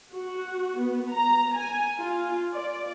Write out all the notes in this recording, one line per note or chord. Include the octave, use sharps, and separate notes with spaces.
F#4
B3
A#5
G#5
F4
D5